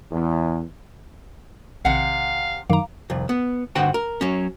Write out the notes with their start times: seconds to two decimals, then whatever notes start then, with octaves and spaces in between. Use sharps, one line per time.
0.12 E2
1.85 A#1 C3 D#3 F5 F#5
2.70 F#2 D#3 F5 A#5 D6
3.10 C2 F2
3.29 B3
3.75 G2 D3 F#4 C5 F#5 G5
3.94 A#4
4.21 F#3 C#4